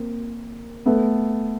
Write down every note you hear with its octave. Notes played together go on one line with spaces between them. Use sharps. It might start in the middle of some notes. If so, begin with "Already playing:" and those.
Already playing: A#3 C4
A3 B3